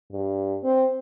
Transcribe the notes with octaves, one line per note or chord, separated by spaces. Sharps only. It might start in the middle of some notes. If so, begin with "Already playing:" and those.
G2
C4